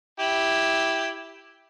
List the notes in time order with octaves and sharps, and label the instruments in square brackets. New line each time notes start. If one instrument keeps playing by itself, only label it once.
[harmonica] E4 G4